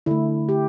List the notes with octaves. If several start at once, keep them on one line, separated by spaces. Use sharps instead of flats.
D3 A3 E4
G4